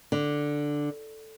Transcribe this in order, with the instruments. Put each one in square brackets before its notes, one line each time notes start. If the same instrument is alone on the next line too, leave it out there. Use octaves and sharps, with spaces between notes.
[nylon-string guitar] D3